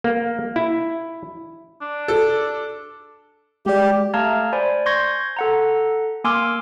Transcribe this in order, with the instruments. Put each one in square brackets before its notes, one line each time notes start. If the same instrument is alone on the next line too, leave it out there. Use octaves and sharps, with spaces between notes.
[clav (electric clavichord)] A#3
E4
[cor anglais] D4
[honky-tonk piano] A4
[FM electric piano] G#3 D5 [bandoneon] G4
[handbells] A3 F5 A5 A#5 F6 G#6
C5 D5 G#5 B5
C6 C#6 G6 G#6 A#6
A4 F#5 A#5
A#3 G#5 C6 D6 E6 F6